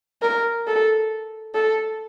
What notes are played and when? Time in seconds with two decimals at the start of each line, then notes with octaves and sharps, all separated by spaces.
0.22 A#4
0.67 A4
1.54 A4